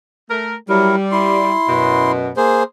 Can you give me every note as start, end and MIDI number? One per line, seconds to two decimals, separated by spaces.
0.30 0.55 57
0.30 0.55 70
0.69 0.96 54
0.69 1.52 55
0.69 0.96 64
0.69 0.96 70
1.12 2.12 64
1.12 2.12 84
1.68 2.31 42
1.68 2.31 47
2.37 2.63 58
2.37 2.63 68
2.37 2.63 72